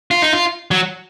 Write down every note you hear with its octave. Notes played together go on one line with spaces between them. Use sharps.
F4
D#4
F4
F#3